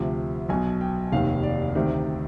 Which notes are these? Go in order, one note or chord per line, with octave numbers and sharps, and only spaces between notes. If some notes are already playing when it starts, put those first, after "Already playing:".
Already playing: D2 C3 F3
B1 B2 G#5
G5
F1 D#2 D#3 F5
D5
D2 C3 D#3